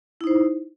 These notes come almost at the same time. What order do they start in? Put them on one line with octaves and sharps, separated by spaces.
E4 D#4 C5